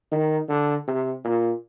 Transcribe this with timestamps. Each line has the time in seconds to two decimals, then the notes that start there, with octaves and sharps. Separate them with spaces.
0.12 D#3
0.49 D3
0.87 C3
1.24 A#2